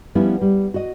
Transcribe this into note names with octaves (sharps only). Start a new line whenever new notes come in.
F3 G3 B3 C#4 E4
G3
F#4 D#5